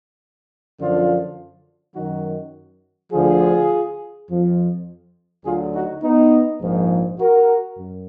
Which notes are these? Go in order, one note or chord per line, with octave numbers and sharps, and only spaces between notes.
F#2 D3 F3 D4 F4
F#2 D#3 F#3 D#4 F#4
D2 D3 F3 F4 G#4
F2 F3
D2 D3 F#3 F4 G#4
D#4 F#4
B3 D#4
A#1 G#2 F3
F#4 A#4
F#2